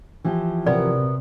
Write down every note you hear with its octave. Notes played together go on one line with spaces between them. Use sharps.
E3 F3 G4
C3 F#3 B3 A#4 D5